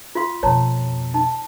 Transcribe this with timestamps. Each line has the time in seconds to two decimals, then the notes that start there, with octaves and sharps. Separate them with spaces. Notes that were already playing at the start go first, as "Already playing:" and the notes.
0.15 F4 F5 C6
0.43 F2 B2 C#5 A5 A#5
1.14 D#4 A5